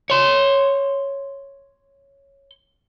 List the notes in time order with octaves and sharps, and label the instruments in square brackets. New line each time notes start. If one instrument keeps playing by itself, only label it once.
[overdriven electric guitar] C#5 C6